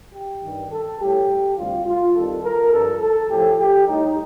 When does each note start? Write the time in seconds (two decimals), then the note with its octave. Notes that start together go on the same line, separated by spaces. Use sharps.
0.14 G4
0.43 G2 D#3 G3
0.71 A4
1.00 A2 G3 G4
1.57 D2 C3 G3 F4
1.86 F4
2.14 C2 C3 D#3 G3 A4
2.43 A#4
2.72 G2 F3 A4
3.00 A4
3.29 A2 F3 G4
3.58 G4
3.86 A2 G3 D#4